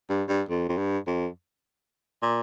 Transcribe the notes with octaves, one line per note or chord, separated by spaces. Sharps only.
G2
G2
F2
F2
G2
F2
A#2